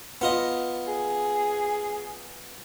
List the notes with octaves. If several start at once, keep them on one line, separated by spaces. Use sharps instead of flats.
B3 F4 D#5
G#4